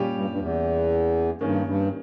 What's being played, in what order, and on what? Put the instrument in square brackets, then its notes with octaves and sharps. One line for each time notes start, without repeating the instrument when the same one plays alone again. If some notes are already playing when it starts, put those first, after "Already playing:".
Already playing: [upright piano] A#2 G3 C#4 G4
[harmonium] G2
G2
E2
[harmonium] G2 [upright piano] D#3 A#3 C#4
[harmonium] G2